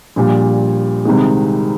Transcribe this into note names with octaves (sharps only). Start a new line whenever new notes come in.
A#1 A#2 G3
C2 C3 D#3 G#3